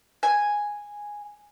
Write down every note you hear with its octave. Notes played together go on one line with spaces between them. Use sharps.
G#5